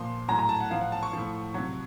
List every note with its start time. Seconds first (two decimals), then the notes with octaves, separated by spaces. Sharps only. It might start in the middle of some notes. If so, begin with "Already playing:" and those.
Already playing: A#2 F3 C6
0.28 A2 F#3 A#5
0.39 A#5
0.49 A5
0.61 F#5
0.71 A2 F3 F5
0.81 F#5
0.92 A5
1.03 C#6
1.13 A2 F3
1.54 C3 F#3